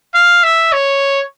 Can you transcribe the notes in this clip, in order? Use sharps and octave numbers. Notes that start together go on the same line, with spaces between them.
F5
E5
C#5